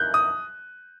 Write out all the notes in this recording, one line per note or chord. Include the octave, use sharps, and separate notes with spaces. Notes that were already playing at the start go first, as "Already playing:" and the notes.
Already playing: F#6 G6
D#6